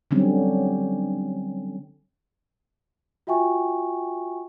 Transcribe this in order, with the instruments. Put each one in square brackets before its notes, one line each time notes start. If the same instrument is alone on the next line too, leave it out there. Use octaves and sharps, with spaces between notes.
[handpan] D3 F#3 G3 C4 C#4
[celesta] F4 F#4 E5 G5 G#5 C#6